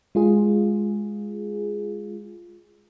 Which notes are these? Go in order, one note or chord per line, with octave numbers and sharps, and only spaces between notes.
G#3 F4 G#4